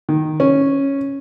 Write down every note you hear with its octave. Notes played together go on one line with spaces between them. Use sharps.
D#3
C#4